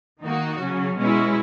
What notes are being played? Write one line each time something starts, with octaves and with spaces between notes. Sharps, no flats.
D#3 A#3 D#4 F#4
C#3 F#3 C#4
B2 G#3 C#4 E4